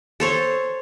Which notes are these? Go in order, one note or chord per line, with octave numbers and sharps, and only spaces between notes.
A4 C5 C#5